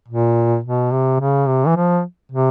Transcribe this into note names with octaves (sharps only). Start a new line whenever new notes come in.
A#2
B2
C3
C#3
C3
E3
F3
C3